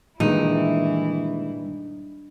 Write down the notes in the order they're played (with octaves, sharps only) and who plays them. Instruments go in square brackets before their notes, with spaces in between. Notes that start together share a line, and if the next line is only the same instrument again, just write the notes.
[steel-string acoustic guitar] G2 [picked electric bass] A#2 D#3 G#3 [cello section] E3 E4 [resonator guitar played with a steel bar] D#4